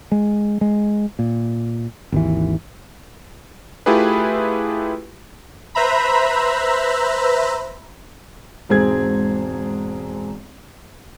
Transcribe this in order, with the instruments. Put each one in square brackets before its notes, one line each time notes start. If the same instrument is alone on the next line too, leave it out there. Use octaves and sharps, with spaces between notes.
[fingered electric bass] G#3
G#3
A#2
G#1 D#2 E3
[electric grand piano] A3 E4 F4 G4 G#4 B4
[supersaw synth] B4 C5 E5 A#5 B5
[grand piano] E1 G#2 C4 G#4 G#6